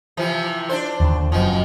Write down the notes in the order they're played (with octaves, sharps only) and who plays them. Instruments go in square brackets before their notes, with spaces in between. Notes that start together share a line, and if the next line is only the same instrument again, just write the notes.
[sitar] C3 E3 F3
D4 C5
[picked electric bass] D#2 D3
[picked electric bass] F#1 F#2 [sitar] B2 F3